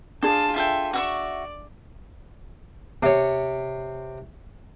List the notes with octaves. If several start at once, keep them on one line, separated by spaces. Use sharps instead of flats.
D4 F4 G#4 A5
F4 A4 E5 G5
F#4 D5 E5 C#6
C3 C#5